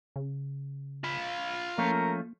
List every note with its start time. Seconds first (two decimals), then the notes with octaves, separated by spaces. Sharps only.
0.16 C#3
1.04 F4 B5
1.78 F3 A3 A#3 C#4 A#4